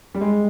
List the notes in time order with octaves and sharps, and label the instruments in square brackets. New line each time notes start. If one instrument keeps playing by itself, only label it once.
[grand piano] G3
G#3